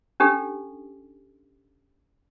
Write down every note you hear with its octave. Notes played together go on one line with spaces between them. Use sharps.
C#4 D4 G4 A4